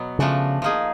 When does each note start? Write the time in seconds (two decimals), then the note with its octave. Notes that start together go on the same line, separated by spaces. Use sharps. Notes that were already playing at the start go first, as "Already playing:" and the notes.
Already playing: B2 F#3 B3
0.19 C#3 F3 A3 D4 F#4
0.62 F3 A#3 D#4 G#4